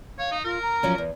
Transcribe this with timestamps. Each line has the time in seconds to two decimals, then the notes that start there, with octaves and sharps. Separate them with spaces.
0.19 C#5 F5
0.31 D#4
0.44 F4 A#4
0.62 A#5
0.83 F3 F#3 C#4
0.98 E2